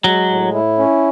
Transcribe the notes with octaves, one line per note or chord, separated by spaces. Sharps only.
F#3 G#3
A2
E4
C#4